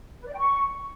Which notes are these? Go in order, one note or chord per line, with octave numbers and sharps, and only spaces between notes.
B4
D5
G5
C#6